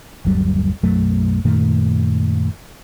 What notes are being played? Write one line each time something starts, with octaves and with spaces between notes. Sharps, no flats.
G1 D#2 F#3 G3
B1 F#2 F#3 A3
F#2 A#2 D#3 A3